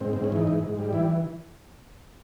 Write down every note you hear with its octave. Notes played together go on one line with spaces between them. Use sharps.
G#2 C4
C4
G#2
C#4
E3 D#4
G#2
G#2
G3
E3 E4